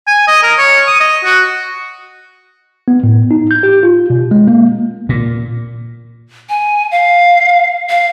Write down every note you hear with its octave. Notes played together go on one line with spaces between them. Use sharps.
G#5
D#5
A#4
C#5
D#6
D#5
F#4
B3
A2
D#4
G6
G4
F4
B2
G#3
A#3
A#2
G#5
F5
F5